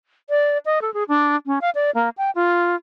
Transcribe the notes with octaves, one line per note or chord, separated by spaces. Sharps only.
D5
D#5
A4
G#4
D4
C#4
F5
D5
A#3
G5
F4